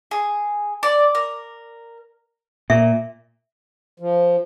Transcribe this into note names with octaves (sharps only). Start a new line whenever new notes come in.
G#4
D5
A#4
A#2 E5
F3